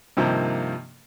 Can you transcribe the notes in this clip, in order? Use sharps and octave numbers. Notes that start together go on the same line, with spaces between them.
G2 C3 D#3 F3 A#3